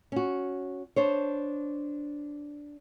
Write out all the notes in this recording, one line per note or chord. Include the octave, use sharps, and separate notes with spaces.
C#4 F#4
D4 C5 C#5